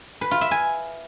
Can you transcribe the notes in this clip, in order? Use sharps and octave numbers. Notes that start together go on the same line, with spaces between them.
B4
F4
E5
G#5